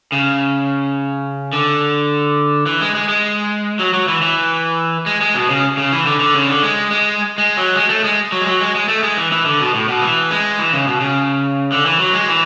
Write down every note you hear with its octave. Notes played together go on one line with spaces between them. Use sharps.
C#3
D3
E3
G#3
G#3
G#3
F#3
F#3
E3
E3
G#3
G#3
B2
C#3
C#3
E3
D3
D3
C#3
D3
G#3
G#3
G#3
F#3
G#3
A3
G#3
F#3
G#3
F#3
G#3
G#3
A3
G#3
E3
E3
D3
B2
A2
B2
E3
G#3
E3
C#3
B2
C#3
D3
E3
F#3
G#3
E3